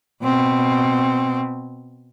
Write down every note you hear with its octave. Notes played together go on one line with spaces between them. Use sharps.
B2 C4